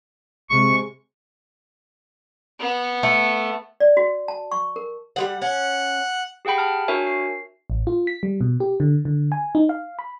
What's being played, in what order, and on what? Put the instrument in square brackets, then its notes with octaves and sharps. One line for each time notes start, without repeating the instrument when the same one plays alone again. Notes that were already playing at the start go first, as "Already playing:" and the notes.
[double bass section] C3 G#3 [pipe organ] C#6
[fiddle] B3
[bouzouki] A3
[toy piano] D5
F#4
A5
C#6
A#4
[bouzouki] G3 G#3 F#5
[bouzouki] C#4 [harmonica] F#5
[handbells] G4 G#4 F#5 G5 B5
A5 F6
D4 F#4 A#4 C#5 E5 G#5
C7
[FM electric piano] A1
F4
B6
G3
B2
G4
D3
D3
G#5
D#4
F5
B5